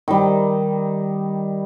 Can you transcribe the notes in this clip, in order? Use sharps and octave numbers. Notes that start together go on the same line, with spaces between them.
D#3 G3